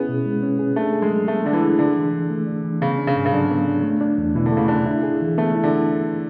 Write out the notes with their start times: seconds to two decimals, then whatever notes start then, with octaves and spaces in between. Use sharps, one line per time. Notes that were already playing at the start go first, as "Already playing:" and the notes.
Already playing: B3 C#4 E4 G#4
0.09 B2
0.26 G#3
0.43 C#4
0.59 G#4
0.76 A3 D4
0.93 G#4
1.02 G#3
1.11 F#3
1.28 A3 B3
1.44 D3 D4
1.53 E3
1.62 G#4
1.79 D3 D4
1.96 E3
2.13 E3
2.30 A3
2.47 D4
2.64 E3
2.81 C#3 B3
2.98 D4
3.07 C#3
3.16 G#2
3.26 C#3
3.33 D3 F#3
3.50 B3
3.67 D4
3.83 A3
4.01 D4
4.18 E2
4.35 B2 E3
4.46 D3
4.52 C#3 A3
4.68 D3 D4
4.86 E4
5.03 G#4
5.21 E3
5.38 A3 B3
5.55 E4
5.64 D3